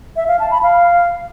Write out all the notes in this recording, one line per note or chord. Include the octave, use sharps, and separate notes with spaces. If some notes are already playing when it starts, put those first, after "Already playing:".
E5
F5
A5
B5
F5